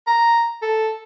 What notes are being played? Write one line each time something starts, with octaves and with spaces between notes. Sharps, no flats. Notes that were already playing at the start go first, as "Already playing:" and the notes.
A#5
A4